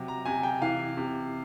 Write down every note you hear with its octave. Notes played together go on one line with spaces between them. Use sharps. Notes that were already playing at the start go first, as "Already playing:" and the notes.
Already playing: C3 F#3
A#5
C3 G#5
G5
E3 F5
C3